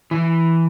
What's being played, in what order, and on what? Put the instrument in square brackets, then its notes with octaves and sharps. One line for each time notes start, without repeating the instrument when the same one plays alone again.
[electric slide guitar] E3